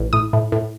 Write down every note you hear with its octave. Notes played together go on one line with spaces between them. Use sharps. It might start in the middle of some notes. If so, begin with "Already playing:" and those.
Already playing: A1
A2 D#6
A2
A2